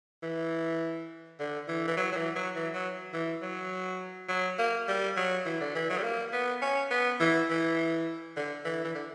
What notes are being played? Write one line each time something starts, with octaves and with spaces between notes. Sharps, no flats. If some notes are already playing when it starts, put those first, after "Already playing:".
E3
D3
E3
E3
F#3
F#3
E3
F#3
E3
F#3
E3
F#3
F#3
A#3
G3
F#3
E3
D3
E3
F#3
G3
A#3
B3
C#4
B3
E3
E3
D3
E3
E3
D3